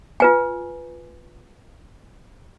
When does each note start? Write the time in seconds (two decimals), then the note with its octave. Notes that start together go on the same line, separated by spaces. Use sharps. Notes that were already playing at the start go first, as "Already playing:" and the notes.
0.20 F4 B4 G#5